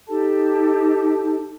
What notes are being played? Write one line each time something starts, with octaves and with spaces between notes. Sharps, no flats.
D#4 G4 A4 A5